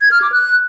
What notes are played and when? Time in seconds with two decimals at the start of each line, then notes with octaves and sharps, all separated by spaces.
0.01 G#6
0.11 F6
0.22 D6
0.32 F#6